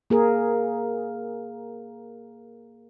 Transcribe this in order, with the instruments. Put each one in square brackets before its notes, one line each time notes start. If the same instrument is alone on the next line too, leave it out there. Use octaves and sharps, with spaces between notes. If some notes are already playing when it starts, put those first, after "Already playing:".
[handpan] A#3 G#4 A#4